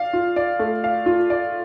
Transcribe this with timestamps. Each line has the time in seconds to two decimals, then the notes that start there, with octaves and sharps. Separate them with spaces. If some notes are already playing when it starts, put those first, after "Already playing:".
Already playing: D5 F5
0.13 F4
0.36 D5
0.59 A3
0.84 F5
1.06 F4
1.30 D5